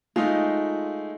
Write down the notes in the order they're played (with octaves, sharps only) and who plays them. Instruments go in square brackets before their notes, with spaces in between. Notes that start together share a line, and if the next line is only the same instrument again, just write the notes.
[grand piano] G#3 A3 D#4 [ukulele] F4